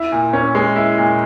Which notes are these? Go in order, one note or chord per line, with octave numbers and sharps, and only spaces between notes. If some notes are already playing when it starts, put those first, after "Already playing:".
Already playing: E4
A#2
C#4
G#3
E4
A#2